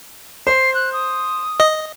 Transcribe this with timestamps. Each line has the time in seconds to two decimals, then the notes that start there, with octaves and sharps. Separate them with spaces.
0.47 C5 C7
0.74 F#6
0.93 D#6
1.60 D#5